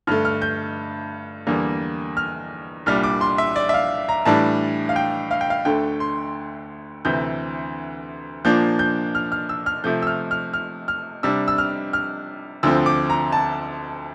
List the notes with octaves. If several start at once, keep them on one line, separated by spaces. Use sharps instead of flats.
G2 D3 A3 F6
F6
G6
E2 D3 G3 A#3
F6
C2 A#2 G3 D4 F6
D6
C6
E5
D5
E5
F5
A#5
A2 E3 G3 D4 A5
F5
G5
F5
G5
F5
D2 D3 A3 G5
C6
D2 C3 E3 G6
A#2 F3 A#3 D4 G6
G6
F6
F6
E6
F6
C3 F3 A3 G6
E6
F6
F6
F6
F6
C3 G3 D4 E6
E6
F6
F6
D2 D3 F3 C4 E6
D6
A#5
A5